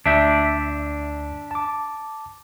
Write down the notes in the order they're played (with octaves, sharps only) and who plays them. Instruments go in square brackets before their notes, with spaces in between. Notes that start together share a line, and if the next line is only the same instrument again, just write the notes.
[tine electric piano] D2 E6 G6 [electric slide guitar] D4 E5
[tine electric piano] A5 D6